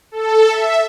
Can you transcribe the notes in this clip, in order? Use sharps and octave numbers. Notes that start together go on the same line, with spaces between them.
A4
E5